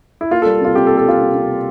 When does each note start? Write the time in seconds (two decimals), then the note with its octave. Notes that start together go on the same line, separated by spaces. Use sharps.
0.21 E4
0.31 A#3 F4
0.42 A4
0.46 G3
0.61 C3 F4
0.75 C3 G4
0.87 A4
0.90 A#3
0.97 A4
1.05 G3 F4
1.20 C3
1.34 C3
1.49 A#3